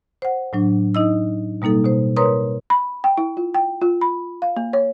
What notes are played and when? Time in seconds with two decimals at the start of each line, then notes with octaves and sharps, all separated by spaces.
0.22 C5 F#5
0.53 A2 F#3 D4
0.95 D#4 D#5 E6
1.62 B2 G3 A#3 D#4 A4
1.85 B2 C5
2.16 A#4 B4 C#5 A#5 C6 D#6
2.70 B5
3.04 G5
3.18 E4
3.37 F4
3.54 G5
3.81 F4
4.01 B5
4.42 F5
4.57 A#3
4.73 C#5